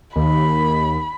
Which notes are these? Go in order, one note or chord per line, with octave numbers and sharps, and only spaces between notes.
D#2 B5